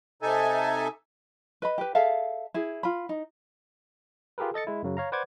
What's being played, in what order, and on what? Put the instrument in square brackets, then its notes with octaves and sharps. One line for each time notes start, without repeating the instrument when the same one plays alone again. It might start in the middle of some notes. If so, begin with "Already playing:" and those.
[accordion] C3 D#4 A4 E5 G#5
[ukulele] B4 D#5 B5
G4 B4
G#4 A4 E5 F5
E4 G#4
F4 B5
D#4
[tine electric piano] F4 G4 G#4 A#4 B4
A4 D#5 A6 C#7
G#3 E4
F#2 C#3 F#3
C#5 F5 A#5
B4 C5 D5 F#5 D6 G#6